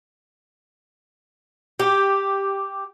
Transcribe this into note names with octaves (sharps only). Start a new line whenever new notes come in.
G4